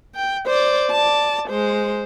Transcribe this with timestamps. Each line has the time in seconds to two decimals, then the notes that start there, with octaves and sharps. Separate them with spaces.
0.15 G5
0.46 C5 D5
0.91 D5 A5
1.49 G#3 C5